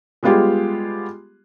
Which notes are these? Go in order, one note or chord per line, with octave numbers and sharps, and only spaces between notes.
G3 G#3 B3 F4 G4 G#4